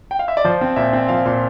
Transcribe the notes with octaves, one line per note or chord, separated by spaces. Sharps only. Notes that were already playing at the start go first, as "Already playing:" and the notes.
G5
F5
E5
D5
F3 C5
C4
A#2 E5
C4
F3 F5
A#2